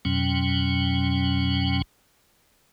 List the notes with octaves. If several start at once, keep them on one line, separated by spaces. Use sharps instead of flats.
F2 B2 F#3 C#4 G5